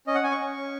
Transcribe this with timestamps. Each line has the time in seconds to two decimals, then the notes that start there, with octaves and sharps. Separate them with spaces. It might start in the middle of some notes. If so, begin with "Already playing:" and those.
0.07 C#4 D#5
0.15 F#5
0.23 C#4 G#5
0.32 C#6
0.41 C#4
0.57 C#4